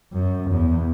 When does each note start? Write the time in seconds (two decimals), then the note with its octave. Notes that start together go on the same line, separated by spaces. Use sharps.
0.13 F#2
0.50 E2